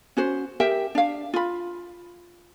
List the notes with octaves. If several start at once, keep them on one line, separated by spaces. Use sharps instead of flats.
C#4 F#4 C5
G4 A#4 E5 G5
D4 F5
F4 B5